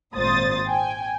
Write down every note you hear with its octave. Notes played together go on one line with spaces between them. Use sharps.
G#1 A#2 C5 D#6 A6
G5 G#5